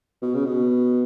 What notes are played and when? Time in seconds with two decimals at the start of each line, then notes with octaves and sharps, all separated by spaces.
0.22 B2
0.34 C#3
0.45 B2